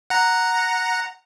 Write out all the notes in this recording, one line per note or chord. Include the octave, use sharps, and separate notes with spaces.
F#5 A#5